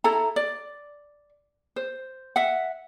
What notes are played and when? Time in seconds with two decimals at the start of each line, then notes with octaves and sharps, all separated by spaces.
0.04 E4 A4 A#5
0.36 D5
1.76 C5
2.36 E5 F#5